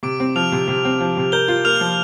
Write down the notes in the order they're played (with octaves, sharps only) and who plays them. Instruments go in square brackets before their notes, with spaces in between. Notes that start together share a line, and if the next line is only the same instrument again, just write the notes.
[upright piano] C3 [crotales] D6 D7
[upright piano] C4
[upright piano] F3 [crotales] F6 F7
[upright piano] C3
C3
C4
F3
C3
[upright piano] A#4 [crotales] G6 G7
[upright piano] F4
[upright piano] A#3 [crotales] F6 F7
[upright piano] F3